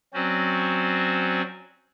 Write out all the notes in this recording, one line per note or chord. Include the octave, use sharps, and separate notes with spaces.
F#3 C4 C#4 F#4 C5 D5